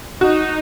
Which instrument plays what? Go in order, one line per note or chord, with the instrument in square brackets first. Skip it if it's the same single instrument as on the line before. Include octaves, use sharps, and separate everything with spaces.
[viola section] D#4 [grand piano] F#4